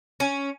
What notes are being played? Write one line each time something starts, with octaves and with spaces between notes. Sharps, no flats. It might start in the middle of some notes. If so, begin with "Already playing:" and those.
C#4